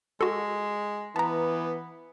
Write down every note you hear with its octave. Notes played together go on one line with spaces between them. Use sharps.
G#3 F#4 A4
E3 B3 A5 A#5